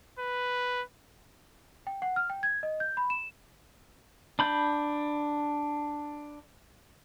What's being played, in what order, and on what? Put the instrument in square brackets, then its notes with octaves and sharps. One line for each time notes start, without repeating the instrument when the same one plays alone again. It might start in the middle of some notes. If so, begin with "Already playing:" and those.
[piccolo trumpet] B4
[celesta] G5
F#5
F6
G5
G#6
D#5
G6
B5
E7
[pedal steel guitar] D4 B5 G6